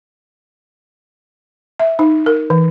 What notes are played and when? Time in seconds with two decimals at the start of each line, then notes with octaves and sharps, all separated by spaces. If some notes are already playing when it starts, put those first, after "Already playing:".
1.79 E5
1.99 D#4
2.26 A#4
2.50 E3